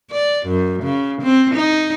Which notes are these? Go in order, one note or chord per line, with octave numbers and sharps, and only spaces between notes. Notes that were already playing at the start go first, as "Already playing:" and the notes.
D5
F#2
C#3
C4
D#4